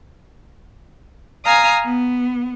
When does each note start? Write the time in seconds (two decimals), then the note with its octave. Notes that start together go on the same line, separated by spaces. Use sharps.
1.45 F5 G#5 A#5 D#6
1.83 B3